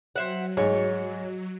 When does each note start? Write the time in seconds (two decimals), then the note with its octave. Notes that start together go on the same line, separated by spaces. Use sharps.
0.16 F#3 C4 E5 F#5
0.57 G#2 C#5